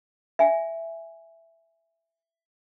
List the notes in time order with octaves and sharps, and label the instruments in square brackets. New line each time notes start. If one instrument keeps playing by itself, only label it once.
[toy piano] E5 G#5